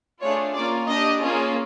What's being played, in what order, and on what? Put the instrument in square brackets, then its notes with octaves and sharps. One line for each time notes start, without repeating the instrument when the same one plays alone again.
[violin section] A3 D4 F4 G#4 C#5
A#3 C#4 F4 D5
D4 G4 D#5
A#3 C#4 F4 G#4